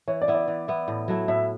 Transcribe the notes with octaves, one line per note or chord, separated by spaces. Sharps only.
E3 C#5
D5
B3 E4
D5
E3
B3 E4
A2
F#3 A3 E4
A2 E5